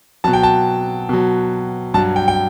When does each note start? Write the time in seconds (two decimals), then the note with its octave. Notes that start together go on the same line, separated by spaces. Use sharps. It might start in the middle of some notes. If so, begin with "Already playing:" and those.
0.24 B2 F#3 A5
0.33 G5
0.43 A5
1.09 B2 F#3
1.94 G2 F#3 A5
2.16 G5
2.28 G5